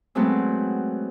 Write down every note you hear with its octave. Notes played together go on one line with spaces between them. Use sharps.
F#3 G#3 A3 B3 C4